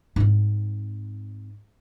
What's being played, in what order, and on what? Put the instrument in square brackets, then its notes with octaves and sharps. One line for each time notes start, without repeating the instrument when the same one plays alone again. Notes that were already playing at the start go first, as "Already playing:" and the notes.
[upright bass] G#2 C4